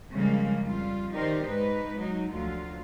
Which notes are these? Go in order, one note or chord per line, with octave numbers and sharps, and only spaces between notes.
C#3 F3 G3 G#3 A#3
F2 G3 F4
D#3 D#4 G4 A#4 C5 D5
G#2 D#4 B4
F#3 D#4
D2 F3 F#3 F4